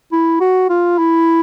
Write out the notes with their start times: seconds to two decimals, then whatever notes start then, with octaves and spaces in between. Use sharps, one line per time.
0.12 E4
0.40 F#4
0.70 F4
0.98 E4